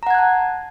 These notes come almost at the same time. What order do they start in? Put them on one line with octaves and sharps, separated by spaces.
A#5 F#5 G#6 F#6 A5